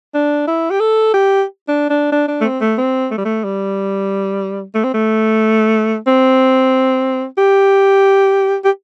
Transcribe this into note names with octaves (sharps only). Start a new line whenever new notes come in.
D4
E4
G4
A4
G4
D4
D4
D4
D4
A3
C4
A3
C4
A3
G3
A3
G3
A3
C4
A3
C4
G4
G4